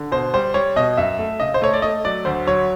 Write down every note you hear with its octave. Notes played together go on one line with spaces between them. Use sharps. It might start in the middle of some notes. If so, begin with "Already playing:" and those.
Already playing: D3
B2 C5
G3 C5
G3 C#5
B2 D#5
F#2 E5
A3
C#3 D#5
C5
A3 C#5
D5
A3 D#5
F#3 D5
D2 C5
F#3 C#5